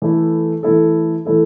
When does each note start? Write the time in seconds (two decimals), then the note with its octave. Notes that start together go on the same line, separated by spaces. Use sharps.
0.02 E3 A3 E4 A4
0.63 E3 A3 E4 A4
1.25 E3 A3 E4 A4